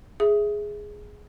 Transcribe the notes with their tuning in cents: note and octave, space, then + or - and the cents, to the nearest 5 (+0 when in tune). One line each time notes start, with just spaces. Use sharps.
G#4 +0 E5 +0